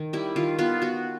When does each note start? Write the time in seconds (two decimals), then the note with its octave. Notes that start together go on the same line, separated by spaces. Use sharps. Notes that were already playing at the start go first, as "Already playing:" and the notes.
Already playing: D#3
0.13 G3 E4
0.36 D#3 F4
0.59 B3 F4
0.82 B3 F#4